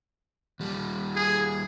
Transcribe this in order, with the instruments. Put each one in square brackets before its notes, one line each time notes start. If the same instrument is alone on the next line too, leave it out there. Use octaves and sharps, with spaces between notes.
[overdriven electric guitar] D#2 G3
[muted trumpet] G#4